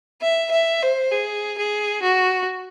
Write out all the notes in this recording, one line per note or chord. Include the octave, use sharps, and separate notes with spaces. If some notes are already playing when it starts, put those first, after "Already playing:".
E5
E5
C5
G#4
G#4
F#4